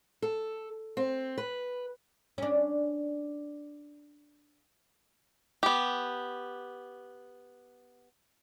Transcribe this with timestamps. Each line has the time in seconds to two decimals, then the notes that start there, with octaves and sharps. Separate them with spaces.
0.22 A4
0.97 C4
1.38 B4
2.38 C#4 D4
5.63 B3 G4